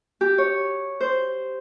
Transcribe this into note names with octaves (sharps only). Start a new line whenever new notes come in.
G4
C#5
C5